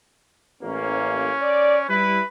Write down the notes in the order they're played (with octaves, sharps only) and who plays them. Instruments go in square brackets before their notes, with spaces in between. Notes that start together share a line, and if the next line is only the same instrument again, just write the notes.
[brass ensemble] A1 A#3 [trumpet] C#4
[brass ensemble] D5
[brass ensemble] G3 E4 [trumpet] B4